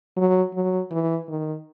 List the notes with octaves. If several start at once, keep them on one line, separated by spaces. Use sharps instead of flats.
F#3
F#3
E3
D#3